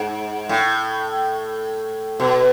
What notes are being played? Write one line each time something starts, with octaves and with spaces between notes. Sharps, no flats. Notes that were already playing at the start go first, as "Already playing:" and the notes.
Already playing: G#2
A2
B2